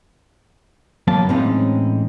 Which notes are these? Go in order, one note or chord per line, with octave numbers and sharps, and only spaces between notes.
F#2 F#3 A#3 B3 A5
A2 E3 G#3 C4 C#4 D#4